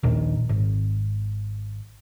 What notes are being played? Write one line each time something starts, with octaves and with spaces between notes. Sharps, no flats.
D#1 A#1 D#3
G#1